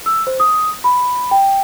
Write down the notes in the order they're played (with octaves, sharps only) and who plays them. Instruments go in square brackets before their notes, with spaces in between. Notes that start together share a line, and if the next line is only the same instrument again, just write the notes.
[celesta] E6
C5
D#6
B5
G5